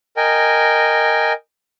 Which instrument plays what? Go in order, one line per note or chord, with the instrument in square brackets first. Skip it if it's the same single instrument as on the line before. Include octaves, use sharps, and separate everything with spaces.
[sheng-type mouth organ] A#4 D#5 G5 G#5